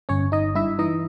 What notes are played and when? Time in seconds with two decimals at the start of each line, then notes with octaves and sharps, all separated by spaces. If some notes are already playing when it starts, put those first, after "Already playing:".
0.09 G1 C#4 C#5
0.32 G1 D#4 D#5
0.55 G2 E4 E5
0.79 E3 D#4 D#5